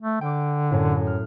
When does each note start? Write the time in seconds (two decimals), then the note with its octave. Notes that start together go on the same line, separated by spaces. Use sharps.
0.01 A3
0.21 D3 G5 D6
0.71 F#2 A2
1.07 F6